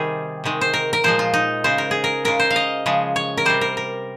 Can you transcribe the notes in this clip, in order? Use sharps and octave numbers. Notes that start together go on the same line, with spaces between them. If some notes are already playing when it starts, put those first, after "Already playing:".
Already playing: C3 D#3 G3 G#4
C3 D#3 G#3
C5
A#4
A#4
A#2 F3 G#3 C5
F4
D#4
C#3 G#3 C5
A#4
G#4
A#4
C#3 G#3 A#4
C5
F5
D#5
C#3 F3 G#3
C#5
A#4
C3 G3 C5
A#4
A#4